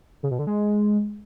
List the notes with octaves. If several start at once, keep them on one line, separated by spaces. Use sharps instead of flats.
C#3
B2
D3
G#3